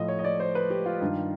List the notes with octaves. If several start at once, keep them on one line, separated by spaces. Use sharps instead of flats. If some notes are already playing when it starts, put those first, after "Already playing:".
Already playing: A2 F3 D#5
C#5
D#5
D5
C5
B4
G4
F4
G2 D#3